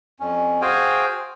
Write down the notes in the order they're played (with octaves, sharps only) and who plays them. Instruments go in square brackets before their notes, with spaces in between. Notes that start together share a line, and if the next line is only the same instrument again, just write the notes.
[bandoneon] F2 C#4
F#4 G#4 C5 F5 G5 G#5